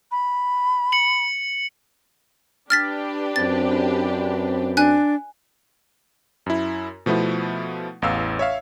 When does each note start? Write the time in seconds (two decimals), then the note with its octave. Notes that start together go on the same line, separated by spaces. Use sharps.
0.11 B5
0.92 C#7 F#7
2.70 D4 G4 B4 F6 A6 B6
3.36 F#2 C4 A6
4.77 D4 G#5 F#6
6.46 F#2 E4
7.06 B2 F3 A3 B3 E4
8.02 A1 E2 F5 E6
8.39 C#5 E5 F5